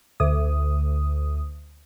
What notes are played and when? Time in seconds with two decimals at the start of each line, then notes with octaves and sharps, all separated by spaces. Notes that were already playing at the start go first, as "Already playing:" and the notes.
0.20 D2 D#6